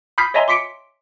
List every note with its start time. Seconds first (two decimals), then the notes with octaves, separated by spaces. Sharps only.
0.18 B5 D#6 F6 G6 B6 C7
0.34 C#5 D#5 E5 G#5 A#5 C6
0.48 C6 D6 B6 C#7 D7